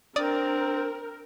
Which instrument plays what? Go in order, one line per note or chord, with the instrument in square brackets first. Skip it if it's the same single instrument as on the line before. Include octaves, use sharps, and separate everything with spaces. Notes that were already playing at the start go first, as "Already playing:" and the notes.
[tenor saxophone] C4 [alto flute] D4 [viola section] A#4 [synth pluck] D5 D#6